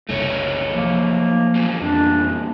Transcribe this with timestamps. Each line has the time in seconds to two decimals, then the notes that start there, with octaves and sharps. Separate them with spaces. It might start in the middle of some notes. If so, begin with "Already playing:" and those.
0.09 F#1 C2 C#3 A3 D#4 C#5
0.74 F3 F#3 A#3
1.55 E2 A#2
1.81 F2 D4